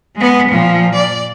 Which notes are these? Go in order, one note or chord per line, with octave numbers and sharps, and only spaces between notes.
G#3 B3
A#2 F3
D5